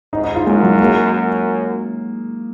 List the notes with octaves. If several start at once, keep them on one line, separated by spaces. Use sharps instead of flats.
G#2 D#4
D#4
F4
F#2 G#3
F#3
A#3
F#2